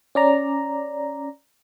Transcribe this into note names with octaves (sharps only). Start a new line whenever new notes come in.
C#4 D5 A#5